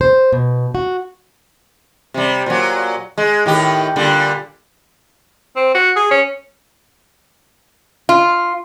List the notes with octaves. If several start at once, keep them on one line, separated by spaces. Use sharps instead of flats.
C5
B2
F#4
C3 G3
A#2 F#3
G#3
A2 D#3 G4
A#2 D3 G3
C4
F#4
G#4
C#4
F4